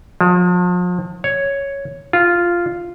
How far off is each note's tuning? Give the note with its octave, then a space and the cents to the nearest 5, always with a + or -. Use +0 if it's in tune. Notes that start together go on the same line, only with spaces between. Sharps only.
F3 +40
C#5 +0
F4 -5